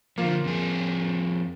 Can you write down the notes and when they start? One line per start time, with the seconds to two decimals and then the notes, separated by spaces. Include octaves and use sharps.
0.18 D3 F3 A#3 F4
0.44 F2 G#4